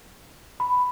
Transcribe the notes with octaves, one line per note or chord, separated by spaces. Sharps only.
B5